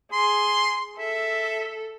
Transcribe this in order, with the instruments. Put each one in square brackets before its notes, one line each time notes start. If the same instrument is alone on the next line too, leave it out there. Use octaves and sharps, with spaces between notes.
[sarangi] G#4 [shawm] C6
[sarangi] A4 [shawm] E5